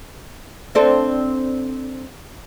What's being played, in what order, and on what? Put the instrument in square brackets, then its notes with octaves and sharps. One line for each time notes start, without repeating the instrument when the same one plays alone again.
[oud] C4 D4 A4